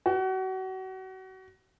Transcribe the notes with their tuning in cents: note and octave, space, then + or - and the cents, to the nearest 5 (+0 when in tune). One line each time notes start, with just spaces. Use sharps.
F#4 +30